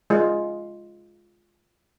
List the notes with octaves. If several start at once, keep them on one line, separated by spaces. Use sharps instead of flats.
G#3 F4